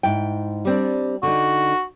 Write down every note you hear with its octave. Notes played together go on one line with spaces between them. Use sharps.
G#2 E4 G5
G3 C4 D4
D3 D#4 F#4